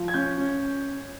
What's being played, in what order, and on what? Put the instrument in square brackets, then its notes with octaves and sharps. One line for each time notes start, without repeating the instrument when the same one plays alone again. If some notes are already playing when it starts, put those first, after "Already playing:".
Already playing: [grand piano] F3
G#6
C#4 G6
C#4